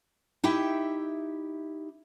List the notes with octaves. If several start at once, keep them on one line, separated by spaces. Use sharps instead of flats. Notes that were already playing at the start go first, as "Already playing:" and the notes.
D#4 E4 G4 E5 G5